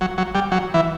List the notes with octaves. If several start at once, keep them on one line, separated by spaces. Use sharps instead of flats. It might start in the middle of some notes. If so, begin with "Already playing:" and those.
F#3
F#3
G3
F#3
E3